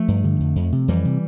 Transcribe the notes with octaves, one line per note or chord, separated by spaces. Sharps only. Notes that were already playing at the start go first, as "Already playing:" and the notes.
Already playing: F3 A3
G2
D3
F2
F2
C3
F2 E3 G3
C3